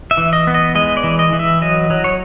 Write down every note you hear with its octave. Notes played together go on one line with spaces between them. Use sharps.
E5
E3
D#5
B3
D#5
G#3 D#5
D5
E3
D#5
E3
E5
F#3 D#5
F#3
C#5